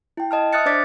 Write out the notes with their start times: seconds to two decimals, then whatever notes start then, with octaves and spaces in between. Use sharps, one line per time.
0.17 E4 G5
0.31 D#5 A5 F6
0.53 E5 D#6 F6 F#6 A6 C#7
0.66 D4 C5 D5 D6 A6 B6